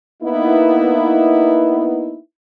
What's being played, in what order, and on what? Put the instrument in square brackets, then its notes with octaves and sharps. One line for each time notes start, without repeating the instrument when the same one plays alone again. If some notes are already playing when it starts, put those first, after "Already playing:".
[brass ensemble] A#3 B3 D#4 E4